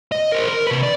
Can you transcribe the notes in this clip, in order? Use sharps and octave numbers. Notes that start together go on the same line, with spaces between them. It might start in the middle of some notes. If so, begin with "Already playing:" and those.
D#5
A#4 C5
A#4
C3 B4
D5